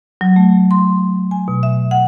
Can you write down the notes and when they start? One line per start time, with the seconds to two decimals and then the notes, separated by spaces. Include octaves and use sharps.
0.21 F#3
0.36 A3
0.71 C6
1.31 G#5
1.48 B2
1.63 E5
1.91 F#5